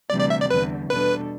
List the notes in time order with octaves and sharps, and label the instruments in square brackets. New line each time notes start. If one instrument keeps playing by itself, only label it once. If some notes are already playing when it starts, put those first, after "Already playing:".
[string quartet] D2 C3 E3 G3 [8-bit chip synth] D5
[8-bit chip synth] D5
E5
D5
[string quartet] E2 D3 G3 [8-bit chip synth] B4
[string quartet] E2 B2 G3 D4 A4 [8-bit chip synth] B4